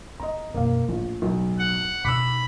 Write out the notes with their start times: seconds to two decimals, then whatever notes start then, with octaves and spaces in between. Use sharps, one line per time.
0.20 B3 D#5 A#5
0.54 F#2 B2 A#3 F5
0.89 A#1 A2
1.22 B1
1.59 F#5
2.05 B2 D#4 B5 D6 E6